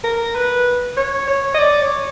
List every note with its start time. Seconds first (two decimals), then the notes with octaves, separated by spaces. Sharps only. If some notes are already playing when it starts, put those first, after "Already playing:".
0.04 A#4
0.35 B4
0.97 C#5
1.27 C#5
1.54 D#5
1.58 D5
1.82 C#5